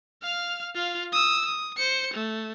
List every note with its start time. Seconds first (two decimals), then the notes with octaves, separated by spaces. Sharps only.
0.22 F5 F6
0.75 F4 F5
1.12 D#6 E6
1.46 D#6
1.77 C5 C#7
2.14 A3